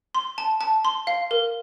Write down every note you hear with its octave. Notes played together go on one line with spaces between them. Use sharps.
C6
A5
A5
C6
F5
A#4